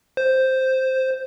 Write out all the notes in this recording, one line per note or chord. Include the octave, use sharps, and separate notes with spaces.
C5